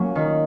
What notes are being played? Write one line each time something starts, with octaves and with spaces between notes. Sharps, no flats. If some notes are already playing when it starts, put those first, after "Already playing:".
Already playing: F#3 A#3 C#4 A#4
D#3